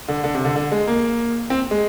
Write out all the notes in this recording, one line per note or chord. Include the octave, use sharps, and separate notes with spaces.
D3
D3
C3
D3
D3
G#3
A#3
C4
G#3